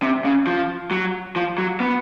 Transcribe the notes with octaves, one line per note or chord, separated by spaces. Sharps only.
C3
C#3
F3
F#3
F3
F#3
B3